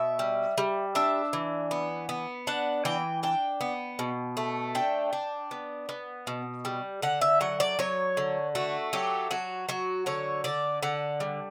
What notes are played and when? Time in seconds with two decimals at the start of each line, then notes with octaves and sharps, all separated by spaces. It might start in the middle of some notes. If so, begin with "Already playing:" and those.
Already playing: B2 E5
0.19 G3
0.58 G3
0.95 D4 E5
1.33 E3
1.71 B3
2.09 B3
2.47 D4 F#5
2.85 E3 G5
3.23 D4 G5
3.61 B3
3.99 B2
4.37 A3
4.75 D4 G5
5.13 D4
5.51 B3
5.89 B3
6.27 B2
6.65 G3
7.02 D3 F#5
7.21 E5
7.41 F#3 F#5
7.60 D5
7.79 F#3 C#5
8.17 D3
8.55 A3 F#4
8.93 F#3 G4
9.31 F#3 F#4
9.69 F#3 F#4
10.06 D3 C#5
10.44 D3 D5
10.83 D3 F#5
11.20 G3